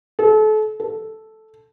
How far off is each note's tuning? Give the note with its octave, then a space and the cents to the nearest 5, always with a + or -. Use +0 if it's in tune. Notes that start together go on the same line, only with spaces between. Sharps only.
A4 -35
A4 -5